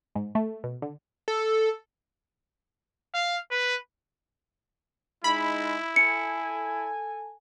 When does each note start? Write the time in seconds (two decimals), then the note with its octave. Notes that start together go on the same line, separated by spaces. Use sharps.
0.15 G#2
0.35 A3
0.64 B2
0.82 D3
1.28 A4
3.14 F5
3.51 B4
5.24 G#3 D#4 E4 B5
5.96 A4 G#5 C#7